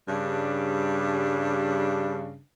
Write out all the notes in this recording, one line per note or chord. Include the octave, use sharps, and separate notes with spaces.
G2 C#3 G3 D4